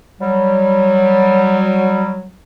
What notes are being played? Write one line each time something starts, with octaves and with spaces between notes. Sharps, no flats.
F#3 G3